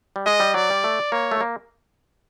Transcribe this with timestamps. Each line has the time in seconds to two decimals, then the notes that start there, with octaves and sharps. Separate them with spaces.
0.16 G3
0.26 G#3 D#5
0.40 G3
0.54 F#3 D5
0.70 G3
0.84 A3
1.12 A#3 C#5
1.31 A3
1.41 A#3